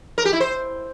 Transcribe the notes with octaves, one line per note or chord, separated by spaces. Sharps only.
A#4
G4
E4
C5